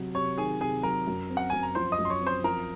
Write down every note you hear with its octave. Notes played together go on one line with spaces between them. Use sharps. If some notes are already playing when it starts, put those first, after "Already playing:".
Already playing: C3 F#3
C3 C#5 C#6
D#3 G#4 G#5
C3 G#4 G#5
F#3 A#4 A#5
F#2
C4
F#5
F#2 G#5
A#5
F3 C5 C6
D#5 D#6
F#2
C6
C#5 C#6
C4
C5 C6
F3 A#4 A#5